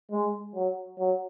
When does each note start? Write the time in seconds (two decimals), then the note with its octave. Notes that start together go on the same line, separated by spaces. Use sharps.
0.11 G#3
0.55 F#3
0.99 F#3